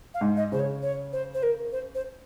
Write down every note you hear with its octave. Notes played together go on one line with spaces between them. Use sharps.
F5
G#2
D#5
C#3 C5
C#5
C#5
C5
C5
A#4
C5
C5